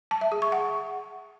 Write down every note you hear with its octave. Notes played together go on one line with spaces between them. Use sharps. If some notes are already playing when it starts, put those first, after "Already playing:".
A5
E5
G#4
C#6
F#5